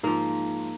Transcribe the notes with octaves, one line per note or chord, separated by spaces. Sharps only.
G#2 F3 A#3